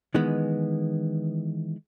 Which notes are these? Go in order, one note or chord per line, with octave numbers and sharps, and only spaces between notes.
D#3 E3 G#3 B3